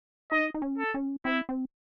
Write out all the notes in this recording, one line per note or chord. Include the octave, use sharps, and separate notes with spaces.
D#4 D#5
D#4
C#4
A4
C#4
C4 E4
C4